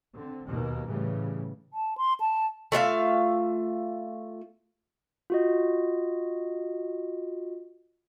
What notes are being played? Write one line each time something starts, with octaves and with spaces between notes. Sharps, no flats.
D3 C4
D#2 B2 D#3 A#3
A2 C#3 E3 G3
A5
C6
A5
A3 F4 E5 F5
F4 F#4 D#5